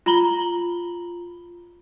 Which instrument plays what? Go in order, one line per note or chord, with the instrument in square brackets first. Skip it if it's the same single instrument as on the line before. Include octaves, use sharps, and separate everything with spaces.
[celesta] F4 A#5 B5 F#7 G7